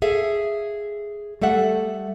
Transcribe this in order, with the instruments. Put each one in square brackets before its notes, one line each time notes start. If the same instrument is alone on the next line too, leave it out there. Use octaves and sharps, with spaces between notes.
[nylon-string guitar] G#4 A4 E5 F5
G3 A3 A4 E5 F#5